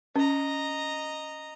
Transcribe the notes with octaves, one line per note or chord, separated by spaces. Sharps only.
C#4 D#5 A#5